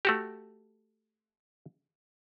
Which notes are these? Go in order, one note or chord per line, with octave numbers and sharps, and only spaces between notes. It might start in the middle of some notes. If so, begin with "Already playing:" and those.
A3 F#4 G4